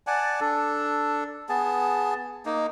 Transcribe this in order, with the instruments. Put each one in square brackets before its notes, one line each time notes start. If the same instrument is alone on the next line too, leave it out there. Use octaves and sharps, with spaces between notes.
[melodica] D5 F#5 G#5 A5
D4 A4
B3 G#4 A5
A#3 D#4